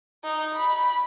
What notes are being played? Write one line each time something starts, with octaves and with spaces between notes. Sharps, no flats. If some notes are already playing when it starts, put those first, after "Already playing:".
D#4
B5